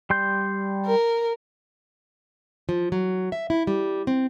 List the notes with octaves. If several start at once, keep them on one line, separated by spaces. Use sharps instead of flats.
G3 C6 G6
A#4
F3
F#3
E5
E4
G3
C4